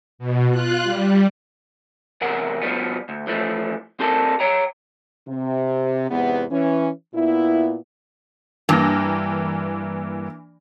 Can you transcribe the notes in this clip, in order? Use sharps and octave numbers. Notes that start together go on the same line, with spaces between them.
B2
F4 F#6
G3
E2 C3 A#4 F#5
B2 F3 G3 B3
D2
E3 F3 A3
C4 G4 A4 A#4
C#5 G5 A#5
C3
E2 G#2 C3 B3
E3 C#4
A#2 B3 E4
G2 E3 A#3 A#6